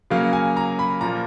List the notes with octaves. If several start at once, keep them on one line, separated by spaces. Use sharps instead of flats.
C#3 F#3 A#3 C#4 F5
G#5
A#5
B5
A#2 F3 A#3 A#5